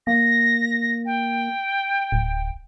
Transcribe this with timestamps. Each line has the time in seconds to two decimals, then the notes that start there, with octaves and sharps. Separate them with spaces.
0.07 A#3 A#6
1.06 G5
2.12 D1